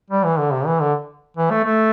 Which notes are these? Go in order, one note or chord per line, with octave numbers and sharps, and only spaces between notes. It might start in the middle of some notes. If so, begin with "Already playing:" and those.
G3
E3
D3
C3
E3
D3
E3
A3
A3